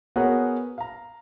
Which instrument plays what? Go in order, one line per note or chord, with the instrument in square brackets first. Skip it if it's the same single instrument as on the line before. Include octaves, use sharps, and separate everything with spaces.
[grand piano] B3 F#4 G#4 A#4 C#5
F5 A#5